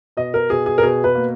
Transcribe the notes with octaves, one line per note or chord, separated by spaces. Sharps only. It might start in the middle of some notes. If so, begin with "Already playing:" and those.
B2 D#5
A#4
B2 G#4
G#4
A#4
B2 G#4
B4
A#3